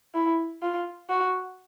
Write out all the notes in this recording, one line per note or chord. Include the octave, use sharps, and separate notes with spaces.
E4
F4
F#4